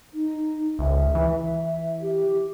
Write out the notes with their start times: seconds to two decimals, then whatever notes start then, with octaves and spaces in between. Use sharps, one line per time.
0.14 D#4
0.79 C#2 E5
1.15 E3
2.02 G4